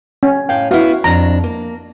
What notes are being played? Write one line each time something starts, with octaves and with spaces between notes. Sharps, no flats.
C#4
A2 C#5 F5 G5
B3 E4 F#4 F5
F2 D4 A#5
A#3